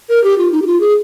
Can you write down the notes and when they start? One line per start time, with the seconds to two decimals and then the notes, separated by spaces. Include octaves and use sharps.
0.09 A#4
0.24 G4
0.38 F4
0.52 D#4
0.62 G4
0.66 F4
0.80 G#4